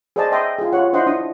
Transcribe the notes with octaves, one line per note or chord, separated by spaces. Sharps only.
G#4 B4 C5 D5 D#5 A5
D#5 E5 G5 C6 D6 D#6
F4 G#4
F4 G4 C#5 F#5
D4 E4 C5 D#5 F#5 C6
D4 D#6